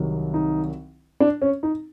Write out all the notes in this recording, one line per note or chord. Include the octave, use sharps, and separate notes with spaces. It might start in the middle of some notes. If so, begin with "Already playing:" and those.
Already playing: C2 C3 D#3 F#3
D#4
D4
C#4
D#4